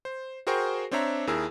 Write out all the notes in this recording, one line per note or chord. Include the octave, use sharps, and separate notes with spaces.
C5
F#4 G#4 A#4 C5 G5 C#6
C4 D4 C5 C#5 E5 A#5
D#2 E4 G#4 A#4 E6